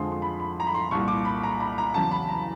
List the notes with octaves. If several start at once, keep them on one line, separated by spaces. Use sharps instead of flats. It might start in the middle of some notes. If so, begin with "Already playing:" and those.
Already playing: F2 D3 F3 G#3 C6
C6
B5
B5
A#5
B5
C6
C2 A#2 G3 C#6
D6
B5
A#5
B5
A#5
E2 C#3 F#3 A5
B5
A#5